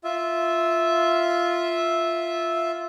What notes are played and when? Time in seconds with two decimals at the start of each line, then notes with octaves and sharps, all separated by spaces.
0.04 F4 E5